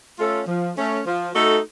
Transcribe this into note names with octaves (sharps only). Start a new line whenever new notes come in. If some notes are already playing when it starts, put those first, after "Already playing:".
A3 C#4 F4 A4
F3
A3 C#4
F3
A3 D#4 F#4 A4